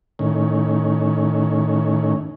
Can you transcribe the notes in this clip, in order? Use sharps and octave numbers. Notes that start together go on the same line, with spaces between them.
A2 D#3 C#4